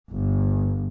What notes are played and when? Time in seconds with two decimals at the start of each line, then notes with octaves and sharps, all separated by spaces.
0.10 G1